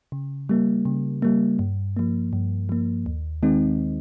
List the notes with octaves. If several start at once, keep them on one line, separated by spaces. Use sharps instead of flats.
C#3
G3 A#3
C#3
G3 A#3
G2
F3 A#3
G2
F3 A#3
D#2
D#3 G#3 C4 D#4